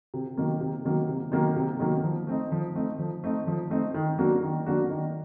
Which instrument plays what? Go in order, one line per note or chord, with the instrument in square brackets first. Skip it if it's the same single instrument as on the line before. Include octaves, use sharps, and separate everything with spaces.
[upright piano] C3
D#3 F#3 A#3
C3
D#3 F#3 A#3
C3
D#3 F#3 A#3
C3
D#3 F#3 A#3
F3
A3 C4 D#4
F3
A3 C4 D#4
F3
A3 C4 D#4
F3
A3 C4 D#4
D#3
F#3 A#3 D4 F#4
D#3
F#3 A#3 D4 F#4
D#3